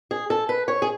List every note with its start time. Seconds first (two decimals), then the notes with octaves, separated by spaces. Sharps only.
0.11 G#4
0.30 A4
0.49 B4
0.68 C#5
0.82 G#4